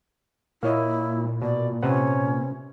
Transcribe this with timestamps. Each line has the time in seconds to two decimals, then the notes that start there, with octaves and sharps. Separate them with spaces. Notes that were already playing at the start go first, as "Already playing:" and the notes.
0.63 A#2 A#3 E4 C#5 D#5
1.42 B2 D5
1.83 C3 C#4 B4 F#5